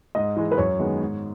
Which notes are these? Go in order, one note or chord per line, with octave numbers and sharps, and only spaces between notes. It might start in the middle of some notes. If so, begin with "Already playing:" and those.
G#2 D#5
E3 G#3
B4
F#2 C#5
D#3 G#3 B3
G#2